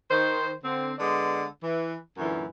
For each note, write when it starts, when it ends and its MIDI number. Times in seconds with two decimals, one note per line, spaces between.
0.10 0.51 51
0.10 0.51 72
0.63 0.93 50
0.63 0.93 60
0.98 1.45 50
0.98 1.45 56
0.98 1.45 59
0.98 1.45 74
1.62 1.96 52
2.18 2.44 42
2.18 2.44 46
2.18 2.44 50
2.18 2.44 52